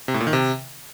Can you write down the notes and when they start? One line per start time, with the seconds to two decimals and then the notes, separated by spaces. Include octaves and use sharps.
0.08 C3
0.14 A2
0.20 A#2
0.27 D#3
0.33 C3